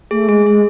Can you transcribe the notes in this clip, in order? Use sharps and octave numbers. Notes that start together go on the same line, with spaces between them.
A3 G#4
G#3 G#4
G#3 G#4